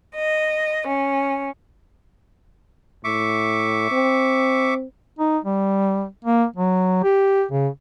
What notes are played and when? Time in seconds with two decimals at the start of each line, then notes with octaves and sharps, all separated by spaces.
0.15 D#5
0.87 C#4
3.04 A2 E5 C#6 D6
3.91 C4
5.19 D#4
5.45 G3
6.25 A#3
6.56 F#3
7.04 G4
7.51 C#3